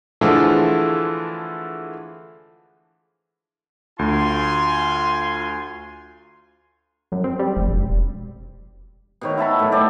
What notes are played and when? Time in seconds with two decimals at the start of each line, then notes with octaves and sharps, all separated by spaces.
0.21 D3 E3 F3 G#3 A3 D4
3.99 D2 F4 G#5 C6
7.12 F#2
7.24 C4
7.39 G3
7.57 F1
7.69 E1
9.21 B2 D#3 C#5
9.38 E4 E5 A5 B5
9.59 A2 F#3
9.72 G4 A4 D5